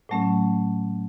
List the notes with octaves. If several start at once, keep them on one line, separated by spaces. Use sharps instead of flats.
A2 F#3 A3 C#4